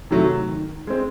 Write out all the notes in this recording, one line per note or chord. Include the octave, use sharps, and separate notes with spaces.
C3 D#3 F#3 A3
D#3
G#3 C4